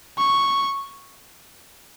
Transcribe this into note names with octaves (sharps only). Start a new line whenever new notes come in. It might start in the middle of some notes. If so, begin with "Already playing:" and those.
C#6